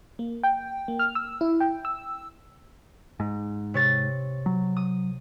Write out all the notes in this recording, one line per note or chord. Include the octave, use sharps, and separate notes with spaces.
A#3
G5
A#3
F6
E6
E4
G5
E6
G#2
C3 C#5 A6
F#3
D#6